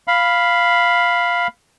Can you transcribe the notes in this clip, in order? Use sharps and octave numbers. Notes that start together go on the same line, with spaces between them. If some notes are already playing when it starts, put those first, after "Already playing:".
F5 B5